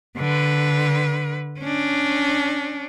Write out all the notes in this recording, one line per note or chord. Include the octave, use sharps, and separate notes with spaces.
D3 B4
C#4 D4